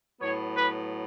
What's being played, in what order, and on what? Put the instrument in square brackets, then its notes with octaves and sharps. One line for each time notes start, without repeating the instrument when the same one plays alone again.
[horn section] A2 F#3 B3 C#5
B4